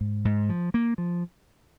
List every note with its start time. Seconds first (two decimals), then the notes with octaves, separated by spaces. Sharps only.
0.01 G#2
0.25 G#2
0.49 F3
0.74 A#3
0.98 F3